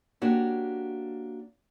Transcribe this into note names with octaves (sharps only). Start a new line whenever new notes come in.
A#3 D4 F#4 G4 C#5